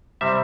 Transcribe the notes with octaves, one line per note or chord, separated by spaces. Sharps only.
C3 G3 C4 E5